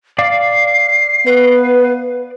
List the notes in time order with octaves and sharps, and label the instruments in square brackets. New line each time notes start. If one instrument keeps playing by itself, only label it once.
[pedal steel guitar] D5 F5 D6 [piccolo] C7
[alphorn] B3 [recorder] B4